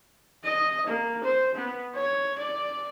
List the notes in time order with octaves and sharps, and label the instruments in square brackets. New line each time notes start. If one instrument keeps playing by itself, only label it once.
[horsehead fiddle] D#5
A#3
C5
B3
C#5
D5